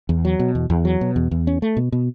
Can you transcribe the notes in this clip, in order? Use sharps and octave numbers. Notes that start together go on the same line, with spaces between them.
E2
F#3
B2
E2
E2
F#3
B2
E2
E2
C#4
A3
B2
B2